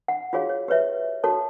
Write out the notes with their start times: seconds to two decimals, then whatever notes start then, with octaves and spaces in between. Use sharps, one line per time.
0.08 F#5
0.33 F4 F#4 G#4 C#5 F5
0.49 C#5
0.68 G4 B4 C#5 E5
1.24 F#4 A4 C#5 A5